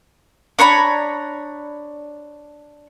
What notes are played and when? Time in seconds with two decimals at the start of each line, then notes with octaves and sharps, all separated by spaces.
0.59 D4 C#5 A#5 B5